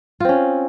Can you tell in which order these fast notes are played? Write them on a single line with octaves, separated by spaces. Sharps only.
F4 C4 C#4